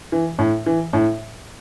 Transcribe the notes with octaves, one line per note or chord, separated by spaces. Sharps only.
E3
A2
E3
A2